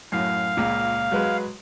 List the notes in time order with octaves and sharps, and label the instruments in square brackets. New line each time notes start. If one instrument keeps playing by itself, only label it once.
[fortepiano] F#2 A2 [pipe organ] F5
[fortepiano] C#2 A#2
F#3 G#3 B4